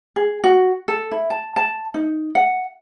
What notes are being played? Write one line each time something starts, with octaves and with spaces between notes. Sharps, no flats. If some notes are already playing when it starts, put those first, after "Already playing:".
G#4
F#4
A4
E4
A5
A5
D#4
F#5